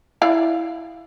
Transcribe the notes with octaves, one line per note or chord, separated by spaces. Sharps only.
E4 D5 F5